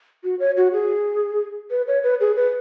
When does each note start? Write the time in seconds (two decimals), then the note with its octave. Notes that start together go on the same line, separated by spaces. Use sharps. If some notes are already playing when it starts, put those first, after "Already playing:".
0.24 F#4
0.40 C#5
0.57 F#4
0.73 G#4
1.71 B4
1.88 C#5
2.03 B4
2.20 G#4
2.36 B4